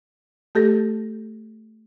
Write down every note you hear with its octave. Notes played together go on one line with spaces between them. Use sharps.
A3 G4 A4 A#6